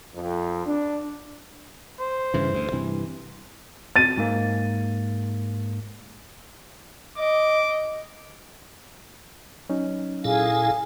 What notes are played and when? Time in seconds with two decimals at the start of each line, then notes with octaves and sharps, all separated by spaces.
0.15 F2
0.66 D4
2.00 C5
2.34 G2 C#3 E3
2.54 D2
2.72 G2 C3 E3
3.96 A6 D#7
4.17 G#2 A#3
7.17 D#5 D6
9.69 F#3 C#4 D#4
10.25 A#2 E4 G#4 A4 F5 G#5